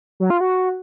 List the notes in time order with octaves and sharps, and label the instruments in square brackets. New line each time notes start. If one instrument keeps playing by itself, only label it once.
[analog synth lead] F#3
F4
F#4